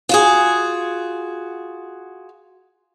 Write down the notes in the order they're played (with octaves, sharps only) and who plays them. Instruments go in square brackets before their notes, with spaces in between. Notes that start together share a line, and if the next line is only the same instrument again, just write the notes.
[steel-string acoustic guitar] F4 F#4 G#4